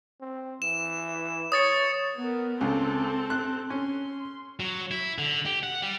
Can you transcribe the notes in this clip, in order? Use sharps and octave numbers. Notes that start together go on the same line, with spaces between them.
C4
E3 E7
C#5 D#6 A6 C#7
B3 A#4
C#2 C4 A4
F#6
C#4 C6
F#3
E4
D3
G4
F#5
G3